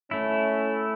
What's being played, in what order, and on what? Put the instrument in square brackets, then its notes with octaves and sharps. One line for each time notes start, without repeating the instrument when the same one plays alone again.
[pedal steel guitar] A3 E4 [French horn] C#4